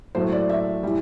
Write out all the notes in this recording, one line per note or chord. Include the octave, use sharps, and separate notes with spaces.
A2 F#3 A3 C5
D5
E5
A2 E3 G3